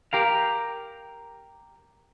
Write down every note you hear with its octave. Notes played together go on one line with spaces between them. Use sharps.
G4 A#4 F5